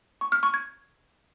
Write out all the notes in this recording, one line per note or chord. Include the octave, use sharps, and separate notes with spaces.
C#6
F6
C#6
G#6